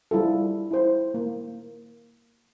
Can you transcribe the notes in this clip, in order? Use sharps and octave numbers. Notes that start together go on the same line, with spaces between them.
G3 E4 F4 A4
E4 C5
A#3